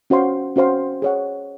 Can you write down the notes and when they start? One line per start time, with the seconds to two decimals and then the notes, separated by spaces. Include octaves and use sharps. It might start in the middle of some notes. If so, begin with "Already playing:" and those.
0.10 C#4 F#4 C5 F5 C6
0.56 C#4 F#4 C5 F5 C6
1.02 G#4 C#5 F#5